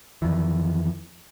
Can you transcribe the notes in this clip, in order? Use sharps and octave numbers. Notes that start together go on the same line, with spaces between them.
F2 D#3 E3